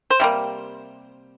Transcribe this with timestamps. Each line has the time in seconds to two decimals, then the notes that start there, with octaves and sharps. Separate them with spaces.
0.10 C5
0.20 C3 G3 A#3